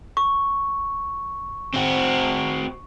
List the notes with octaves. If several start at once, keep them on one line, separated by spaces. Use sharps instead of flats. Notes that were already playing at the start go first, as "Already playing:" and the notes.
C#6
C4 F#4